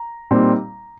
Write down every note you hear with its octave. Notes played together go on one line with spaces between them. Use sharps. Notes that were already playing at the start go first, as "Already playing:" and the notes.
Already playing: A#5
A#2 G3 C4 D#4